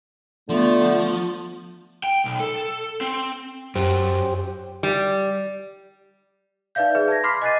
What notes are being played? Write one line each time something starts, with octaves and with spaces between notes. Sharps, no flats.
D3 F3 A3 B3
G5
B1
A4
C4
F#2 G4 C5
G3
D#4 B4 D5 E5 F5 G6
G#4 B4 E5
A5 G#6 A#6
B5 C6 D6 F6 B6 C7
D#5 G#5 F#6 A6 C7 D#7